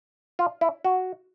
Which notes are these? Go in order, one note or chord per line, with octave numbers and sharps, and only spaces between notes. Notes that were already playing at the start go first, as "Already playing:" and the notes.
F4
E4
F#4